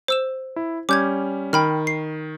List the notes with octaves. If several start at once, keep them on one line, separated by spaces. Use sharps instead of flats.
C5 E6 E7
E4
G3 C#4 D6 G6 G#6
D#3 G5 B5 F6
C7